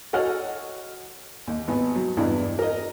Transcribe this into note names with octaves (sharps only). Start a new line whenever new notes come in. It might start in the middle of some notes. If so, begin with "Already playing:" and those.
F#4 A4 C#5 D#5 F#5 F6
D#2
G#1 B3
F#3
E2 G2 E4 D5 D#5
A#4 D#5